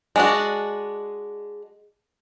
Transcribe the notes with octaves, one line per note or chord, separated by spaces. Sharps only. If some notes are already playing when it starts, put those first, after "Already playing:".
G#3 D4 F#4